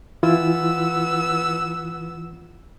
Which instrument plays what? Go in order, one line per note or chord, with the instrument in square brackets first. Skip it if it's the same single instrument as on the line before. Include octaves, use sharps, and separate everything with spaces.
[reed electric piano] E3 E4 F4 [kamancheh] B3 E6